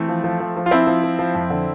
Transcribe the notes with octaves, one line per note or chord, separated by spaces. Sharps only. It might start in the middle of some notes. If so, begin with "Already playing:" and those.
Already playing: E3 A3 C4
F3
F3
F3
F3
F4
F3 C4 E4
F3
F3
F3
F2
D3